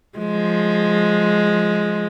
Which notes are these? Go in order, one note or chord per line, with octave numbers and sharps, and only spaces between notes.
F3 G#3